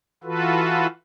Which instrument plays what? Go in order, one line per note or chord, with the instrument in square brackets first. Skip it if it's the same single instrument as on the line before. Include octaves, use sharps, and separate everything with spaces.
[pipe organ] E3 F4 F#4 A4 B4